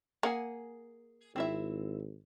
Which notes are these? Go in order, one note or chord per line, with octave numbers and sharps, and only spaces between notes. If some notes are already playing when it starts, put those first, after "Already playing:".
A#3 G#4 F#5 G#5
G#1 C4 E4 E5